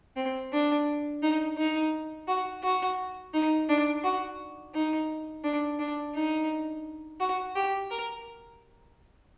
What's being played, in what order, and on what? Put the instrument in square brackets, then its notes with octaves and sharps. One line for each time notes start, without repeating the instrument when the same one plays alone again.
[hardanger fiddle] C4
D4
D#4
D#4
F#4
F#4
D#4
D4
F#4
D#4
D4
D4
D#4
F#4
G4
A#4